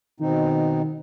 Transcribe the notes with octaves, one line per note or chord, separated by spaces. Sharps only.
B2 D#3 C4 D#4